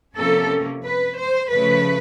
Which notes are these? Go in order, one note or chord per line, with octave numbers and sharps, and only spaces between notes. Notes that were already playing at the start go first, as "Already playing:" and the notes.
C3 F3 A#3 C#4 A4
B4
C5
C#3 F3 A3 B4